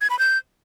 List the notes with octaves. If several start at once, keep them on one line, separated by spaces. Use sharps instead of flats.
G#6
B5
G6